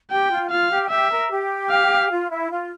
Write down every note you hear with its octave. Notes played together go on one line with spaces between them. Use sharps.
G4 G5
F4
F4 F5
G4
G4 E5
A#4
G4
F5
F4
E4
F4